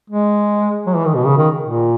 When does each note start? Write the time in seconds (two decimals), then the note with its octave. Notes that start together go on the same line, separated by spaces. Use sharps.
0.10 G#3
0.87 F#3
0.96 E3
1.05 D#3
1.15 B2
1.25 C#3
1.37 D#3
1.63 A#2